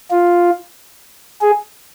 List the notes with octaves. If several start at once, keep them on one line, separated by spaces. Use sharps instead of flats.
F4
G#4